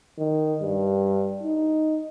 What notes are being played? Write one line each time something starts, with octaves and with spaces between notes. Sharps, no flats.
D#3
G2
D#4